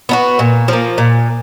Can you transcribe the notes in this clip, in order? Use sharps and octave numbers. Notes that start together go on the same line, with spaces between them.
B3 D#4 F#4
A#2
F3 A#3
A#2